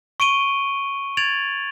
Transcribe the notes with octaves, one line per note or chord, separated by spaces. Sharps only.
C#6 D7 D#7 G7
G#6 A6 D7 F7 F#7